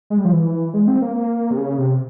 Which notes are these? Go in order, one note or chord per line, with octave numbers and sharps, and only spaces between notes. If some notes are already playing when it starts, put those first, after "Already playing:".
G#3
G3
F3
E3
G#3
C4
A#3
A#3
C3
C#3
C3